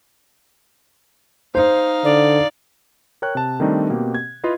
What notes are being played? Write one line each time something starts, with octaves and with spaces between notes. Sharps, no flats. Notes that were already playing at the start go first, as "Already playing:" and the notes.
D#4 C5 F5
D3 D5
A#4 C#5 G5 F#6
C3 A5
D#3 G3 A3 C4 D4 D#4
B2 A#3 C4 G4
G#6
E4 F4 B4 D#5 F5